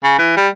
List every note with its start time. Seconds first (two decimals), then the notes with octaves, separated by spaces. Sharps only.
0.04 C#3
0.19 E3
0.37 G3